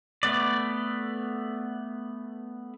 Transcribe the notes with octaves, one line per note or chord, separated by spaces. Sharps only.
A3 B3 D5